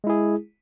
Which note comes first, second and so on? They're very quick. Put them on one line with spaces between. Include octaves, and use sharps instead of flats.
G#3 E4 G#4